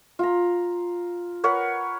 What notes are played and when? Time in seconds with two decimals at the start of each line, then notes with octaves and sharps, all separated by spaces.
0.19 F4 A#5
1.44 A#4 B4 C#5 F#5